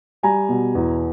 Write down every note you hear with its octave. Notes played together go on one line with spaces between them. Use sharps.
G3 G#5 A#5
B2
E2